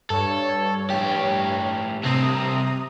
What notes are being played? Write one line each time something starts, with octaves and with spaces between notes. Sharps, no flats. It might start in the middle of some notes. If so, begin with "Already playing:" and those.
G2 A4 C#5
A2 G4
G2 C3 C4 A#5 D#6